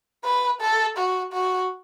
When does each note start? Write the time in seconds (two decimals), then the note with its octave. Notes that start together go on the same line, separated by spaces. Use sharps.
0.25 B4
0.61 A4
0.97 F#4
1.33 F#4